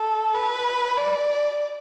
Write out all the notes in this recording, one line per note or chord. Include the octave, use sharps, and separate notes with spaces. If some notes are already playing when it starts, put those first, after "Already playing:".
Already playing: A4
B4
D5